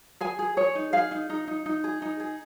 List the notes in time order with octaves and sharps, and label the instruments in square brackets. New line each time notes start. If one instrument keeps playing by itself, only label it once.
[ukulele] G#4 G#5
G#4
G#4 C#5
D#4
G#4 F5
D#4
D#4
D#4
D#4
G#4
D#4
G#4